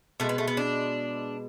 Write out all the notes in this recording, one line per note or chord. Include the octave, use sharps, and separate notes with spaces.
B2 G#3 A3
B3
A3
B3
D4